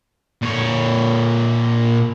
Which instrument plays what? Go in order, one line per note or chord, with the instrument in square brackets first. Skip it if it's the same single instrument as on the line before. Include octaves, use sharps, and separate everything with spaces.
[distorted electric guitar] A#2 C#5